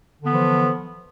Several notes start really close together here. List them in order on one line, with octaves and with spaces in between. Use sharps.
D3 B3 E3 F3